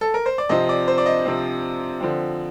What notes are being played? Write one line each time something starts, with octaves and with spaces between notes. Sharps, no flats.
A4
A#4
C5
D5
C3 F3 C4 D#5
D5
C5
D5
D#5
C3 F3 C4
D3 F3 C4